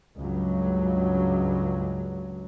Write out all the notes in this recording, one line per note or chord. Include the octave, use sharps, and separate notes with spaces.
C#2 G2 F#3